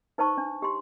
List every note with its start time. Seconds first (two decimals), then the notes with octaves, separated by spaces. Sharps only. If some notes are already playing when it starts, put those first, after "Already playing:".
0.18 D#4 B4 C5 A5 C#6
0.38 D4
0.62 G4 C6